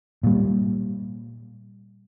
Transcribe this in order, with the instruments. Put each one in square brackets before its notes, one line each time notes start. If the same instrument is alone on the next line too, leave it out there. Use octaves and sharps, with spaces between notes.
[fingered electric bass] A#2 G3